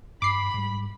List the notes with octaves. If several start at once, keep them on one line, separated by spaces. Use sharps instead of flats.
G2 B5 D6 C7
G#2 G3